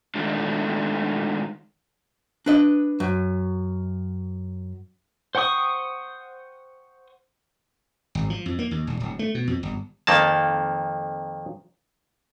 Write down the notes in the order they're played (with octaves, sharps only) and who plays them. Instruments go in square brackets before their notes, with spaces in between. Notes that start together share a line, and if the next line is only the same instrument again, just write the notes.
[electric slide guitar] D#3 G#3 A3 D4 D#4 F4
[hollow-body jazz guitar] D4 B4 D#5
F#2
[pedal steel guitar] C5 F#5 G5 C#6 D#6
[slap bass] G#1
F3
F2
A#3
D#2
E1
D1
A3
B2
F2
G1
[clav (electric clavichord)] F2 D#3 A#3 A5